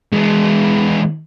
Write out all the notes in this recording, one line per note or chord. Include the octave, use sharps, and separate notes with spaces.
E3 G#3